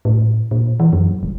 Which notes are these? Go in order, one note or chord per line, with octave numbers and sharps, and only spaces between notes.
A2
A#2
E3
F#2
F1